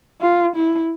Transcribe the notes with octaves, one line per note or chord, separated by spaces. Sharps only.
F4
E4